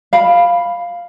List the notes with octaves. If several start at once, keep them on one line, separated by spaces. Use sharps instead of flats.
F5 B5